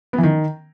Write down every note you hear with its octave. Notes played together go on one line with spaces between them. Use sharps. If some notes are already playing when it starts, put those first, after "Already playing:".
B3
E3
D#3